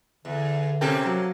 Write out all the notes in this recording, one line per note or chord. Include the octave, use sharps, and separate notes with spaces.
E2 D3
C3 A#3 C4 C#4 A4 G5
F#3